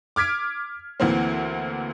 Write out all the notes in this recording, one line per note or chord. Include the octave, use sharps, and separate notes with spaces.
D6 F6 G#6 B6 D7
D2 E3 A#3 C4